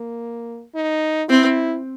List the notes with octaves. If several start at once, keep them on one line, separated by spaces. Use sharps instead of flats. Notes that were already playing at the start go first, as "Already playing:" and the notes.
Already playing: A#3
D#4
C4 E4